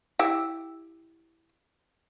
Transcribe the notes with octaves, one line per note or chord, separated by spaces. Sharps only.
E4 G4